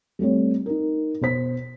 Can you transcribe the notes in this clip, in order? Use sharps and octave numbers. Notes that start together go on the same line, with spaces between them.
G3 A3 C4 C#5
D#4 A#4
B2 C5 B6